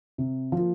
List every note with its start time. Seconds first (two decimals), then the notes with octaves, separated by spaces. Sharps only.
0.18 C3
0.52 F3 A#3 F4